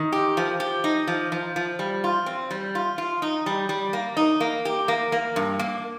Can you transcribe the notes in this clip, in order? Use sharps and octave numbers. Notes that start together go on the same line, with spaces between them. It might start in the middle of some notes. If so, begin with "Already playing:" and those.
Already playing: D#3
G4
F3
G4
D#4
F3
F3
F3
G3
F4
C4
G3
F4
F4
D#4
G3
G3
A#3
D#4
A#3
G4
A#3
A#3
G2
A#3